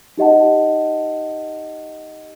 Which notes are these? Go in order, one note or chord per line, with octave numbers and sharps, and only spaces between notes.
D#4 G4 D#5 F#5 A5